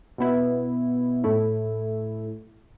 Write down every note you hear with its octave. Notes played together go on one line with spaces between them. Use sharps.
B2 B3 E4
A2 A3 E4